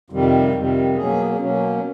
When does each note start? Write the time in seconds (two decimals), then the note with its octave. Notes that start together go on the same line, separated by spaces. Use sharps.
0.10 F2 C3 D#3 G3
0.54 F2 C3 D#3 G3
0.96 B2 F#3 A#3 C#4 G#4
1.39 B2 F#3 A#3 C#4